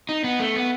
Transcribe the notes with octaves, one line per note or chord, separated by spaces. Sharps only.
D#4
B3
A3
B3